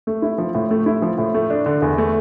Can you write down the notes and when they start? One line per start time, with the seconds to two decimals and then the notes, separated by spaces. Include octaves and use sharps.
0.07 A3
0.22 E4
0.38 F3
0.55 A2
0.71 A3
0.86 E4
1.02 F3
1.18 A2
1.34 A3
1.50 D4
1.66 D3
1.82 E2
1.98 A3